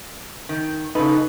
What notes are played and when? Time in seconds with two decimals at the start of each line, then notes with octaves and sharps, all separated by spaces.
0.49 D#3
0.95 C#3 D#4 A4 B4